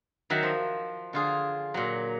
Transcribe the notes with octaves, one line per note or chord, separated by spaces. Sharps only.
D#3 F#3 E5 F#5
F3
D3 F4 G#4
A#2 F#3